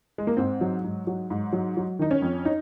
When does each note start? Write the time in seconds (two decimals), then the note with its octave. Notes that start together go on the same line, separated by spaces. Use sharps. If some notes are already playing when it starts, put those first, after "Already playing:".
0.18 G#3
0.27 A#3
0.37 G#2 C4
0.61 F#3
0.84 G#2
1.07 F#3
1.30 G#2
1.53 F#3
1.77 F#3
1.99 D#3 D#4
2.11 C#4
2.22 F2
2.45 D#4